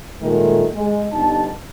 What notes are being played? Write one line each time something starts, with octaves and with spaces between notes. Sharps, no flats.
A#2 D#3 F#3 G#3 A3
G#3
G1 G2 B3 D#4 A5